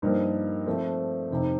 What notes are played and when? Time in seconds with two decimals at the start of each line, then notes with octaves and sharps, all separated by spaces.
0.02 G2 F3 A#3 D#4 A#4
0.66 F3 A3 C4
1.31 F2 C3 D#3